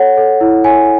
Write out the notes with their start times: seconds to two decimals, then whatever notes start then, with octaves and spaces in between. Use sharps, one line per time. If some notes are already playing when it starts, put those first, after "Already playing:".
Already playing: A4 C#5 F#5
0.17 A4
0.41 E4
0.64 C#5 G#5